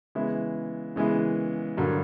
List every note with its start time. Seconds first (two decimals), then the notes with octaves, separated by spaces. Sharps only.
0.15 C#3 E3 G#3 B3 E4
0.96 C#3 E3 G#3 B3 E4
1.77 G2 D3 F#3 A#3